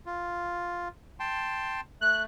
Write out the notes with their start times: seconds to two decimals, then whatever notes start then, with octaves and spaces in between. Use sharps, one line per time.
0.06 F4
1.20 G5 A5 C6
2.01 A3 F#6